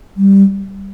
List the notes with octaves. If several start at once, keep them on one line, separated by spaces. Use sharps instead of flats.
G3